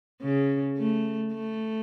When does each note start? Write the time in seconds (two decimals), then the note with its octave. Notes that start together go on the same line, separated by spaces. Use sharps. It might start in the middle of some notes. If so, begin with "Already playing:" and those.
0.22 C#3
0.78 A3
1.33 A3